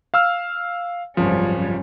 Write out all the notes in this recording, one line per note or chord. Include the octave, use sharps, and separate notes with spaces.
F5 E6 F6
G#1 C#2 F#2 F3 G3 C#4